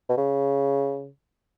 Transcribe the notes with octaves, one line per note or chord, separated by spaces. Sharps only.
B2
C#3